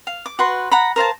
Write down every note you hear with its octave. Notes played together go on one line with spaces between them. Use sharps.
F5
D6
F#4 B4 C6
F#5 A#5 B5
A#4 C5 F5 A5